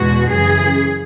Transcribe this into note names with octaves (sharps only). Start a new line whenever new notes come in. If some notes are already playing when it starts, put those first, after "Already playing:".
Already playing: E2 B2 G#3 F#4
F#2 C#3 E3 G#4